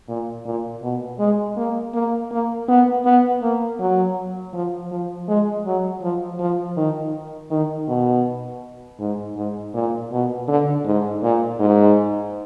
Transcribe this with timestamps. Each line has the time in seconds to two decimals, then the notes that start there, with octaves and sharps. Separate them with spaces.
0.08 A#2
0.45 A#2
0.82 B2
1.19 G#3
1.57 A#3
1.94 A#3
2.31 A#3
2.68 B3
3.05 B3
3.42 A#3
3.80 F#3
4.54 F3
4.91 F3
5.28 G#3
5.66 F#3
6.02 F3
6.40 F3
6.77 D#3
7.51 D#3
7.88 B2
9.00 G#2
9.37 G#2
9.74 A#2
10.12 B2
10.48 D3
10.86 G#2
11.23 A#2
11.60 G#2